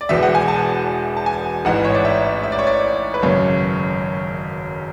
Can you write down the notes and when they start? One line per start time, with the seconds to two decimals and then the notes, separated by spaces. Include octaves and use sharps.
0.01 D5
0.09 E1 E2 B2 E5
0.23 F#5
0.35 G#5
0.48 A5
1.17 A5
1.26 G#5
1.65 A1 G#2 E3 F#5
1.85 C#5
1.95 D5
2.05 E5
2.43 E5
2.52 D5
2.59 C#5
2.67 D5
3.14 B4
3.22 G#1 F#2 C#3 C#5